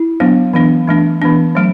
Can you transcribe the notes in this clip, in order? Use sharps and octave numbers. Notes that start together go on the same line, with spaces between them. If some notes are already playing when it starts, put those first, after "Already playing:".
Already playing: E4
F#3 B3 D4
E3 B3 D4
E3 A3 D4
E3 B3 D4
F#3 A3